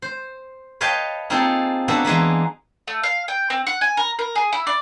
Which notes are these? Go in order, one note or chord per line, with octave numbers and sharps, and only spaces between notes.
C5
B4 C#5 D#5 F5 G5 A5
A#3 C4 D#4 F4 G#4 A4
A#3 B3 D4 F#4 A4
E3 G#3 A#3 B3
A3
F5
G5
C4
F#5
G#5
A#4
A#4
G#4
E4
D5